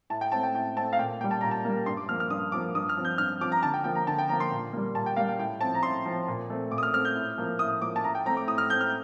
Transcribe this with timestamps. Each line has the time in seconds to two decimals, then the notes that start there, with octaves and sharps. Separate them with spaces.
0.10 A2 A5
0.21 G5
0.32 A3 C4 A5
0.43 G5
0.54 A2 G5
0.76 A3 C4 A5
0.93 F5
0.99 A#2 G5
1.21 A#3 G5
1.24 G3
1.31 A5
1.41 A#2 A#5
1.51 A5
1.65 G3 A#3
1.86 G2 C6
1.97 D6
2.08 F3 A#3 F6
2.20 F6
2.30 G2 D#6
2.52 F3 A#3 D6
2.75 G2 D#6
2.89 F6
2.97 F3 C4
3.05 G6
3.18 G2 F6
3.41 F3 C4 D6
3.52 A#5
3.63 D3 A5
3.74 G5
3.84 F3 A#3 G5
3.95 A#5
4.07 D3 A5
4.19 G5
4.29 F3 A#5
4.32 A#3
4.40 C6
4.51 A#2
4.73 G3 A#3
4.95 A#2 A5
5.06 G5
5.16 G3 A#3 F5
5.29 G5
5.39 A2 G5
5.61 F3 C4 A5
5.75 A#5
5.83 A2 C6
6.06 F3 C4
6.28 A#2
6.50 A3 C4
6.71 A#2 D6
6.78 D#6
6.83 F6
6.94 A3 C4 F6
7.05 G6
7.15 A2
7.38 F3 A#3
7.59 A2 D#6
7.81 F3 A#3 D6
7.96 A5
8.04 A2 A#5
8.15 G5
8.26 A3 C4 A#5
8.37 D6
8.47 A2 D#6
8.58 F6
8.70 A3 C4 G6
8.81 F6